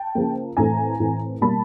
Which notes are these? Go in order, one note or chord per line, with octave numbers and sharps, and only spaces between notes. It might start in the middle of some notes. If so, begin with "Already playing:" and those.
Already playing: G5 A5
C#3 F3 A#3
A2 E3 A3 C4 G#5 A#5
A2 E3 A3 C4
B2 G3 A#3 A5 B5